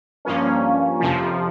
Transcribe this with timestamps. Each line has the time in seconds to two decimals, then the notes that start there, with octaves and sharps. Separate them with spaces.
0.25 G2 F3 A#3 C#4
1.00 F2 C3 F3